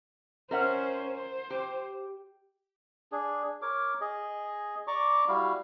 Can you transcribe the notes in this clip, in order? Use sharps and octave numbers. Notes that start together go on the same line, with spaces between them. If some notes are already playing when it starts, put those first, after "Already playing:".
C#4 A#4 C5 E5 F#5
C5
G4
D4 G#4
A#4 C#5 D6
G#4 D#5
D5 A#5 C#6 D6
G3 E4 F#4 F5